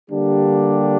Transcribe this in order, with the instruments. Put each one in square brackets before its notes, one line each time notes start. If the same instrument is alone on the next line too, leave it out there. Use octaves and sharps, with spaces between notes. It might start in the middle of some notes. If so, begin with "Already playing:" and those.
[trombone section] D3 G3 A#3 D4 G4